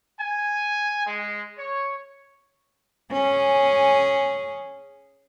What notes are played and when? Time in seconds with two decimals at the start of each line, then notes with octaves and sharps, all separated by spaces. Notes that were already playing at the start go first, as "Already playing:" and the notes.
0.20 G#5
1.07 G#3
1.58 C#5
3.13 C#4 G#4